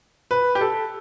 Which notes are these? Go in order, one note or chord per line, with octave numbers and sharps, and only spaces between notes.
B4
G4
A4